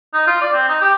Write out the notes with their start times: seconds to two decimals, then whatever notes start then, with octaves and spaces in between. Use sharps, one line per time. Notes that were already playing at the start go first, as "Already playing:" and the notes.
0.13 D#4
0.27 F4
0.41 D5
0.53 C4
0.68 D#4
0.81 G4